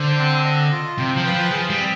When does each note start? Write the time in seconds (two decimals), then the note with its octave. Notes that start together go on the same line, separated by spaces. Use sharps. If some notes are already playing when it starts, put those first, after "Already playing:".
Already playing: D3 C5
0.18 C4
0.45 D#5
0.72 F4
0.98 C3 G5
1.16 F3
1.25 B4
1.33 F3
1.51 F3 G#4
1.70 G3
1.78 C4